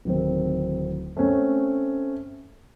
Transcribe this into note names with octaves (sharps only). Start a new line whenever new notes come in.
D1 D#3 C4
A3 C4 C#4